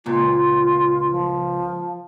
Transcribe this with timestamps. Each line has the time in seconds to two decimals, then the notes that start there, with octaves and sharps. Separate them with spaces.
0.06 C#2 A#2 F4
1.11 F3